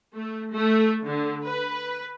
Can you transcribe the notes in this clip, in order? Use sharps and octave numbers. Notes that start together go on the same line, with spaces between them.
A3
A3
D3
B4